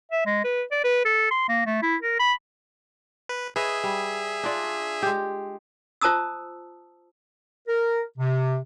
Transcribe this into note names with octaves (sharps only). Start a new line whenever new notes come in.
E5
G#3
B4
D5
B4
A4
C6
A#3
A3
E4
A#4
B5
B4
G#4 B4 C#5 D#5 E5
G3
D4 F4 D5
G#3 G4
F4 C5 A5 A#5 D#6 E6
A#4
C3